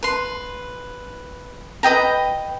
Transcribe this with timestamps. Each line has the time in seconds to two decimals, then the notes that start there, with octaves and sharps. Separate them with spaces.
0.03 B4 C6
1.83 B4 D#5 G5 A#5